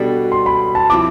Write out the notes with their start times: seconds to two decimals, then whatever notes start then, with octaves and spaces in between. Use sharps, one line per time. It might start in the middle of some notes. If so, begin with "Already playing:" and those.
Already playing: B2 G3 D4 A4
0.32 C6
0.46 B5
0.75 A5
0.90 F3 C4 E4 D6